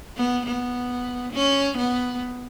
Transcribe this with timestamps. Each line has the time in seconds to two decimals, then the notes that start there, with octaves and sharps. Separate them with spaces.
0.17 B3
0.47 B3
1.34 C#4
1.78 B3